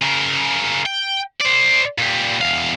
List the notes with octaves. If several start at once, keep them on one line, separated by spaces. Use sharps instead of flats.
C#3 A#4
G5
C5 D5
A#2 G3
E2 F5